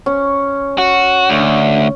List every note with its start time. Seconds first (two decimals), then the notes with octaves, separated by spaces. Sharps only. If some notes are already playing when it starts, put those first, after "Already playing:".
0.06 C#4
0.78 F#4
1.30 D2